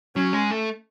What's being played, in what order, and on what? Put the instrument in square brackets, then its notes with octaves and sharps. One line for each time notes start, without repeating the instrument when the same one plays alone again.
[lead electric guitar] F#3 [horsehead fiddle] C#4
[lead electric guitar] G#3
A3